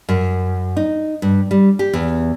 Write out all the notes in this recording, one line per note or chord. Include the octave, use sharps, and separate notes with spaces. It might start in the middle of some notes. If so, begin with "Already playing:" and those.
F#2
D#4
G2
G3
G4
E2